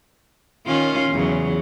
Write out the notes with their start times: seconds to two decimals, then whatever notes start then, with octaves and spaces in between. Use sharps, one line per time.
0.67 D#3 C#4 F4
1.11 E2 C#3 F#3